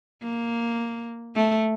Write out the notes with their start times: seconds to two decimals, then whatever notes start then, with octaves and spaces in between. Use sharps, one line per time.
0.23 A#3
1.36 A3